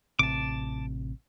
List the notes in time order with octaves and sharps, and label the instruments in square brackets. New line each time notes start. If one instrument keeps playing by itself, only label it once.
[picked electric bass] A1 C3 [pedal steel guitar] A5 D6